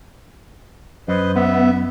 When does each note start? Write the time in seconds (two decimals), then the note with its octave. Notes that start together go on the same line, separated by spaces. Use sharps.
1.08 F#2 B4 C5 D#5
1.36 B3 E5